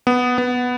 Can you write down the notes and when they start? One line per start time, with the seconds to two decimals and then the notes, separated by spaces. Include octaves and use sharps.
0.07 B3
0.38 B3